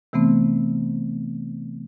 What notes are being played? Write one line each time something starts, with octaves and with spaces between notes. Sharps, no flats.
C3 E3 A3 B3 C4